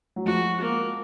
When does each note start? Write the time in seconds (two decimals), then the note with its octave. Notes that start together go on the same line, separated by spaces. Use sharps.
0.16 F#3
0.26 F3 G#3 F#4
0.61 A#3